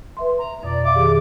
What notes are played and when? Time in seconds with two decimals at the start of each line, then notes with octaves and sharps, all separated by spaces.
0.17 B4 E5 C6
0.38 A#5
0.63 F2 B2 D5
0.84 E5 F5 D6
0.95 D#3 G4 G#4